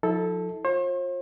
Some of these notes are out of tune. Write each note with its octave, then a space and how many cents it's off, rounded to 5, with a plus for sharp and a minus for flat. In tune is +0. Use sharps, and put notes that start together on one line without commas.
F3 +35 E4 -45 A4 +0
F4 +25 C5 +45